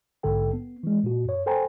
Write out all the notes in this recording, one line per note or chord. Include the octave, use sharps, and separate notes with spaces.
A#1 G#2 D3 A4 G5
B3
E3 G#3
A#2 F#4
F#2 C#5
A4 C5 G5 G#5 A#5